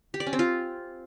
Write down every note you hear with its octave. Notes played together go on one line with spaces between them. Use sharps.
G4
D5
C#4
C4
F4